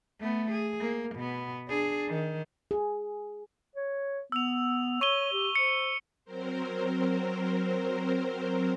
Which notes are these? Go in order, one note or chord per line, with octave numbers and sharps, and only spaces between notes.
A3 B3
G#4
A#3
B2 B3
D4 G#4
D#3
G#4
C#5
B3 E6 F7
C#5 C#6 D#7 G7
G4
C5 C#7
F#3 C4 A#4 C5